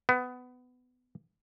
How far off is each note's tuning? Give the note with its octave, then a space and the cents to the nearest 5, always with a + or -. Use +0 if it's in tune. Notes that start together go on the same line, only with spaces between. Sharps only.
B3 +20